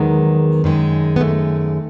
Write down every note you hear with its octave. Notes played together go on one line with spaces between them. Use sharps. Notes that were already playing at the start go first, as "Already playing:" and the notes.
Already playing: E2 D#3 F#3 G#3 B3
F#2 D#3 G#3
B3
A3